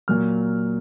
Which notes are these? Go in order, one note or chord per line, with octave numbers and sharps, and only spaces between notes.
A#2 F#3 A#3 F6